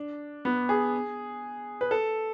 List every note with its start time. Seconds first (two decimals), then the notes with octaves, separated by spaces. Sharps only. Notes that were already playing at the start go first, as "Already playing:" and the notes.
Already playing: D4
0.45 B3
0.69 G#4
1.81 B4
1.91 A4